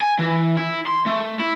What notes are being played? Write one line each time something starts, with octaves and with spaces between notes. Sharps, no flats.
G#5
E3
E4
C6
A3
E4